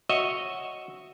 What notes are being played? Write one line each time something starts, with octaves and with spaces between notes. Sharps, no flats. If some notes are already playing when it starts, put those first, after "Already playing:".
F#4 C#5 D#5 E5